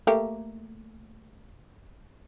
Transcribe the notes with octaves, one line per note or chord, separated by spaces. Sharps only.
A3 A#3 G4